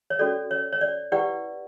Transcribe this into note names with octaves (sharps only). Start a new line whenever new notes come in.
C#5
C#4 F#4 A4 D5
C#5
C#5
D5
E4 G4 B4 D5 F#5